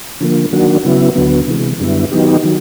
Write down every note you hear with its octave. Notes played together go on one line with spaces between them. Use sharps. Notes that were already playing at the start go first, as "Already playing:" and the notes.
D3 F3 A#3
D#3 F#3 A#3 D4 F#4
C#3 F#3 B3 E4
D2 D3 F#3 B3
C3 E3 G#3
F#2 D3 G3 B3 E4
D#3 F#3 B3 D#4 G4
D#3 F#3